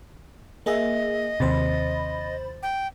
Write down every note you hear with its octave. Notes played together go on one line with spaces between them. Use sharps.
A#3 G#4 D#5 E5
D#2 C3 C5 B5 A6
G5